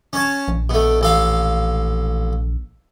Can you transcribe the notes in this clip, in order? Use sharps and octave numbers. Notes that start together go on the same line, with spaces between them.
C#4 C#5 A5
A#1
B2 A3
A1 A4 F5